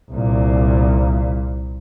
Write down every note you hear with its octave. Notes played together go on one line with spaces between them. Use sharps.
C2 A#2